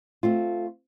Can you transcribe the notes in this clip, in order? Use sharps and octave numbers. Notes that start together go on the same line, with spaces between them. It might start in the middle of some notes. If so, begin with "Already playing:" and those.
A3 C4 F4